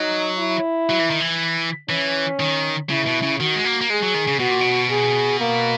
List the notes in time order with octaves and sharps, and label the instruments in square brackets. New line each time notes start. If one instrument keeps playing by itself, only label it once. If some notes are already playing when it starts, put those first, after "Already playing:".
Already playing: [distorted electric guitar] F#3 [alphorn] D#4
[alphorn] E4
[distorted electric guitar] F#3
E3
D#3
E3
[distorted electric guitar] E3 [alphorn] C#4
[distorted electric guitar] D#3
[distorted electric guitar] C#3 [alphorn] E4
[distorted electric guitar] B2
C#3
[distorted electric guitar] D#3 [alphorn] F#4
[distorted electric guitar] G#3
A#3
A#3
[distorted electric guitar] G#3 [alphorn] G#4
[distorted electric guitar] F#3
D#3
C#3
[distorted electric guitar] B2 [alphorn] F#4
[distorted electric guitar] A#2
B2
[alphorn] G#4
A#3